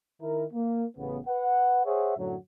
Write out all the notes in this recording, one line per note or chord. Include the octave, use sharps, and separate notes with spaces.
D#3 E4 A#4
A#3
A1 C#3 B3
B4 F#5
G#4 C5 C#5 E5 F#5
F#2 A2 D3 F#3